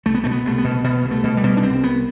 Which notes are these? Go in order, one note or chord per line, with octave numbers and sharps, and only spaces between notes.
C2 A3
B3
B2 A3
B3
C2 A3
B3
B2
B2 B3
C2
A3
B2
G3
B2
D4
C2 C4
C2 B3